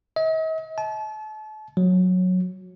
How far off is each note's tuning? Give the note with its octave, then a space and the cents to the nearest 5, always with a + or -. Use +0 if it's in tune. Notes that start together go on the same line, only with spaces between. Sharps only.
D#5 +45
A5 -35
F#3 -15